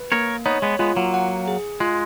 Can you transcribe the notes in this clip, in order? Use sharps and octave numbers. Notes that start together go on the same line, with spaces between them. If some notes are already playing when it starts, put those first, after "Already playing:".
Already playing: B4
A#3 A#4 C#5
B3 D#4 C#5
G#3 B3
G#3 B3 F4
F#3 A#3
F#5
G#4
G#3 F4